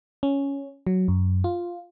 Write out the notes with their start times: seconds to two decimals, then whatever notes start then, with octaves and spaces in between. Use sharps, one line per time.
0.23 C#4
0.87 F#3
1.08 F#2
1.44 F4